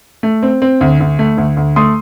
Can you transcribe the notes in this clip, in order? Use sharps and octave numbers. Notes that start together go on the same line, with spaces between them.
A3
C4
C4
D2
D2
A3
D2
D2
A3 C6 D#6